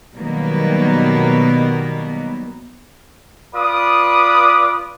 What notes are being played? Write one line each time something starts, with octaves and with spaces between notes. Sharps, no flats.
B2 D#3 F#3 G3 A#3 B3
F4 B4 D5 B5 D6 D#6